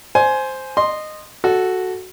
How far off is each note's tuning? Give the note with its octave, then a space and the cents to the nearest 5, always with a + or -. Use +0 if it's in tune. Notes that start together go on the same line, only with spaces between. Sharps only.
C5 +0 G#5 +15
D#5 -15 C6 +0
F#4 +0 A4 -5